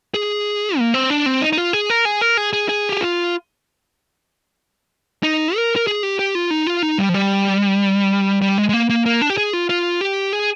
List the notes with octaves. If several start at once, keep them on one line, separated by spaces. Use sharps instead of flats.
G#4
A#3
C4
D4
C4
D#4
D#4
F4
G#4
A#4
G#4
A#4
G#4
G#4
G#4
G4
F4
D#4
A#4
A#4
G#4
G4
G4
F4
D#4
F4
D#4
G3
F3
G3
G3
G#3
G#3
A#3
A#3
A#3
D4
G4
G#4
F4
F4
G4
G#4